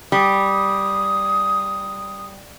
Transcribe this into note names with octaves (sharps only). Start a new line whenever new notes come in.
G3 D#6